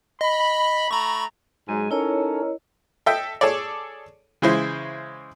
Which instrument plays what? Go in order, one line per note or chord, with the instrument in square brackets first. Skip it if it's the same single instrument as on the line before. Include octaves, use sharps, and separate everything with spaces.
[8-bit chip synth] D#5 [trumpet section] B5
[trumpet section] A3 A#5 [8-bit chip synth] B5 C#6
[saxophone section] G#2 F#3 G#3 [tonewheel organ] G#5
[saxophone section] C#4 A#4 [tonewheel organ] D#4 A4 [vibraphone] E4 C#5 D#5
[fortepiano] A4 D#5 E5 G5
G#4 A4 C#5 D5
C#3 E3 G#3 E4 C5